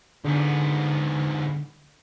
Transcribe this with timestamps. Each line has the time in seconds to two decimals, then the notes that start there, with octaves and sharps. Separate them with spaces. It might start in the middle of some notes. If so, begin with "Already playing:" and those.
0.24 G#2 D3 B3